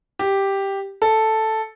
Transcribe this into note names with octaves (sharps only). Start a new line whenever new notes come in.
G4
A4